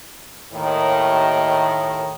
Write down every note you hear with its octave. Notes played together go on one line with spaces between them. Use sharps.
D#2 A2 D#3